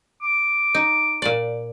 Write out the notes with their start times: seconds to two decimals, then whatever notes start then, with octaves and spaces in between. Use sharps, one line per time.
0.22 D6
0.75 D#4
1.22 A#2 D5